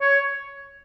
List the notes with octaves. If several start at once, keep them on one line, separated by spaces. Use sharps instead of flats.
C#5